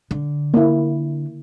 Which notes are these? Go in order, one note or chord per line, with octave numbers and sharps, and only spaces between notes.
D3
A#3 E4